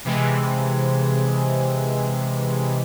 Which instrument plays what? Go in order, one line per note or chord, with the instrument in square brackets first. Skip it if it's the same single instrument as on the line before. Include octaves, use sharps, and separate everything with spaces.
[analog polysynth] C3 E3 G#3